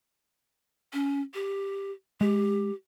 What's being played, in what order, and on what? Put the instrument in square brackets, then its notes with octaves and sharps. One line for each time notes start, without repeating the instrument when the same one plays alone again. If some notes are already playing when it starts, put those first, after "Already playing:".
[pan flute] C#4
G4
[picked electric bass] G#3 [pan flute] G4